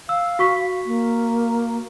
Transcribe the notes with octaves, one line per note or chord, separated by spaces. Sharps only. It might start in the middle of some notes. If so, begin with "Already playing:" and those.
F5 E6
F#4 C#6 B6
A#3